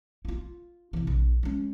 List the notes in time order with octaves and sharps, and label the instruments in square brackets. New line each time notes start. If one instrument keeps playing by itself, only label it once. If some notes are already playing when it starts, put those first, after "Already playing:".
[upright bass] E4 F4
C3 E3
A#1
G#3 C#4